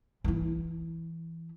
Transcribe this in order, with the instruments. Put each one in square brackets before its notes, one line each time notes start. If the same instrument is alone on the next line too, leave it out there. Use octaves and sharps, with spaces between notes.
[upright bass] E3 E4